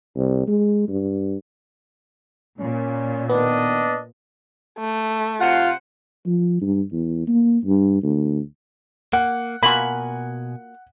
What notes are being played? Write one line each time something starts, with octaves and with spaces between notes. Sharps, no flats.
C2
G#3
G2
A#2 C#4
D#3 B3 D4 D#5
A3
C3 F4 C5 F#5
F3
G2
E2
A#3
G2
D2
A#3 F#5
B2 A#3 F4 F#4 G#5 B5